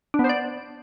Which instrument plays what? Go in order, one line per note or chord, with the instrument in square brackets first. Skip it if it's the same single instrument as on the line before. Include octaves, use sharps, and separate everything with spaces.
[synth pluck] D4
B3
C5
D5